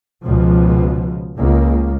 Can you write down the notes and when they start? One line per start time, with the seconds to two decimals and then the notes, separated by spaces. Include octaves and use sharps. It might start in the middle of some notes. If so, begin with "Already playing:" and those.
0.23 C#2 B2 F3
1.37 C#2 A#3